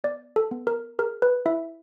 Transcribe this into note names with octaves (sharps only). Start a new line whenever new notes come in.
B3 D5
A4
B3
A#4
G#4 A#4
B4
E4 E5